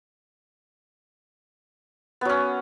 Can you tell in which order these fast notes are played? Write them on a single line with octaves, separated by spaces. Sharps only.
B3 F#3 C#4